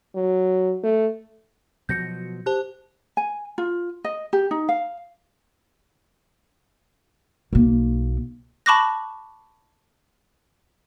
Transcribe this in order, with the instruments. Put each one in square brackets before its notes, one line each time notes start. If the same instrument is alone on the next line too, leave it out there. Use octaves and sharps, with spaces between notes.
[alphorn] F#3
A3
[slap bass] B2 F3 F#3 [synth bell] G6 A#6 C#7
[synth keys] G4 [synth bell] C5 A5 F#6
[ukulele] G#5
F4
D#5
G4
D#4
F5
[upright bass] B1 A#3
[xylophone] A5 B5 C#6 D6 F#6 A#6